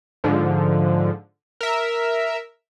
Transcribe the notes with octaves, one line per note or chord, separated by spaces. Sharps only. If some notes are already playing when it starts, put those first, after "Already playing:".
G#2 D3 F3
A#4 E5